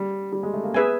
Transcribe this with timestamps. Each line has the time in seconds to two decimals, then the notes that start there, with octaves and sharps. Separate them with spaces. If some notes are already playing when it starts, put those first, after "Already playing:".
Already playing: G3
0.33 G3
0.43 G#3
0.54 A3
0.64 A#3
0.74 B3 G#4 B4 E5 G#5